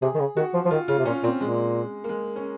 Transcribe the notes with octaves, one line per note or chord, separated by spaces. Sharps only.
C3 G#4
D#3
C#3
D#3 F#4
F3
F3
D#3 F4
C#3 F4
C3
A#2 C#4
A#2 C4
A#2 G#3
A#3
G#3
C#4